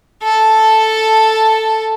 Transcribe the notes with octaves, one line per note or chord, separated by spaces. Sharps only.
A4 A5